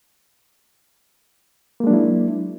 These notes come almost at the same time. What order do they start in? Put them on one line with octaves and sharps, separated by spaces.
A#3 G#3 D4 F#3 E4